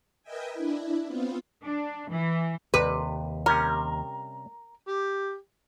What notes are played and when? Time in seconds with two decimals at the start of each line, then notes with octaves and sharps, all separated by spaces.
0.23 A#4 B4 D#5 E5 G5 G#5
0.53 D4 E4
1.07 B3 C4 F4
1.63 D4
2.09 E3
2.74 D#2 C3 B4
3.46 C3 G3 C#4 A#4
4.87 G4